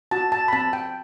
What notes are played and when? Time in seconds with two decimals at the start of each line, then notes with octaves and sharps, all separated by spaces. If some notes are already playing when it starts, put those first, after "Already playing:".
0.11 F#4 A5
0.32 A5
0.48 B5
0.53 C4 A5
0.73 G5